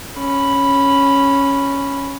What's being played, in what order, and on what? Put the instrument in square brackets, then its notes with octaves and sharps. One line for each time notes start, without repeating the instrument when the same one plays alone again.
[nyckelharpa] C#4 B5